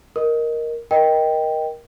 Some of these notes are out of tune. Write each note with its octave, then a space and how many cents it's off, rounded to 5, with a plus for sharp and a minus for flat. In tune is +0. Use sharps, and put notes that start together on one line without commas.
A#4 +5 D#5 +0
A#4 +15 D#5 +0 G5 +0